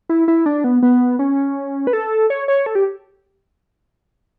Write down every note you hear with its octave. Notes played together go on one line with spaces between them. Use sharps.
E4
E4
D4
B3
B3
C#4
B4
A4
C#5
C#5
A4
G4